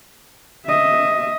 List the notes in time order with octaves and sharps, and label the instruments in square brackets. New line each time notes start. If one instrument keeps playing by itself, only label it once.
[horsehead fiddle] D#5 E5